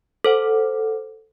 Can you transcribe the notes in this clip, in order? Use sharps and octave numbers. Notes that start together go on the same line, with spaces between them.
A4 C5 F#5